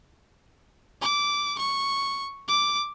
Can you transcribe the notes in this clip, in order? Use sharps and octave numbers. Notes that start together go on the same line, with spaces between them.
D6
C#6
D6